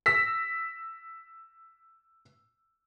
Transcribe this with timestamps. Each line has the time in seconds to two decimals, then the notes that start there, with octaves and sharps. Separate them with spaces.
0.06 E6 A#6 B6